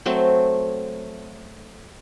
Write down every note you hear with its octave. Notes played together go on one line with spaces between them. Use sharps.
F#3 A3 C4